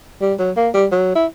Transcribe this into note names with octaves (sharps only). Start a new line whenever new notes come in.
G3
F#3
A#3
G3
F#3
E4